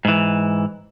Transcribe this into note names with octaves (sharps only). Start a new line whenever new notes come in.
G#2 E3